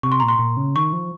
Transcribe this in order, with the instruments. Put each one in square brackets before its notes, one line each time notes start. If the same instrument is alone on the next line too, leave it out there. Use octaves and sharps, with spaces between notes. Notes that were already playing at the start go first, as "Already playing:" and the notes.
[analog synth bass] C3 [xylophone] C#6
[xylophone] C6
[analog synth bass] A#2 [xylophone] A#5
[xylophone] C6
[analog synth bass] A#2
C#3
[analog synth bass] D#3 [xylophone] C#6
[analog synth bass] F3